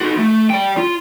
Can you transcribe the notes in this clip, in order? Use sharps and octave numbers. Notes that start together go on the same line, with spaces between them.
D#4 F#4
A3
D5 G5
F4